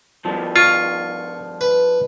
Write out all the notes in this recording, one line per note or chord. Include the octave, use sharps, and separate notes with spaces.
G2 F3
F4 C#6
B4